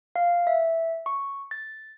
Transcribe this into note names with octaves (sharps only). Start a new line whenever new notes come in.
F5
E5
C#6
A6